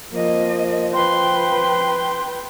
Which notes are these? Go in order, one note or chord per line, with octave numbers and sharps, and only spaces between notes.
F3 A#3 D#5
B4 G5 C6